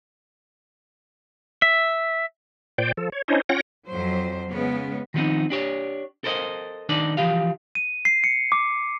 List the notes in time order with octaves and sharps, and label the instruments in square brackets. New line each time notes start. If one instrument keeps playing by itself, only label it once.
[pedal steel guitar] E5
[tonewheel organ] A#2 C5 D5 G5
F3 A4
C#5
C#4 D4 E4 C5 C#5 D#5
C#4 F4 C#5 F#5 G5 A#6
[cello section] F2 F#3 C5
C#3 G#3 B3
[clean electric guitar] D#3 F3 G3 B3 C4 D#4
D4 G4 C#5
A4 A#4 C5 D#5
D#3 D4 D#4 A4 B4 D5
E3 F3 G4 F5
[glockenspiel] D#7
C7
C#7
D6